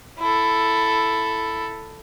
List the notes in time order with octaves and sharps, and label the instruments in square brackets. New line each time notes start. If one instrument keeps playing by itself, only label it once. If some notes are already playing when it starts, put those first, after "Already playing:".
[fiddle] E4 A4